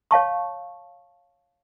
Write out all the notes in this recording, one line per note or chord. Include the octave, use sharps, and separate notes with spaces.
C#5 F5 A5 C#6